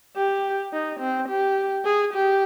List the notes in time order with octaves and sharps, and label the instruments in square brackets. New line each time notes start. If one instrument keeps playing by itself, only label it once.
[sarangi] G4
D#4
C4
G4
G#4
G4